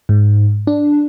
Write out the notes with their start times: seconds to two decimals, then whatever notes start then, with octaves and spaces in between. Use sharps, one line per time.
0.09 G#2
0.67 D4